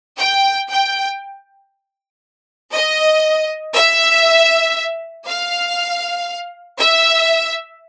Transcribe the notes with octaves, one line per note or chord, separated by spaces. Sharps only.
G5
G5
D#5
E5
F5
E5